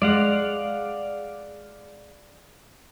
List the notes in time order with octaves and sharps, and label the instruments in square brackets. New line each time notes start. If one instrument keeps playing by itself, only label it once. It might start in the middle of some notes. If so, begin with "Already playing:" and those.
[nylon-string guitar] G#3 [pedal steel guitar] D5 F5 F#5